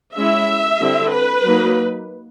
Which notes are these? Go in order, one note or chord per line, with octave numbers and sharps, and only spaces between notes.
G#3 C#4 E4 E5
D3 G3 C4 E4
B4
F#3 A#3 D#4